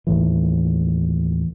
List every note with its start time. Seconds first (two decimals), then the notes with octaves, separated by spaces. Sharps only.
0.07 D#2 A2 E3